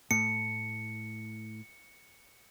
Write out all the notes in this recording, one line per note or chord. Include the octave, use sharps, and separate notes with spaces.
A2 C#7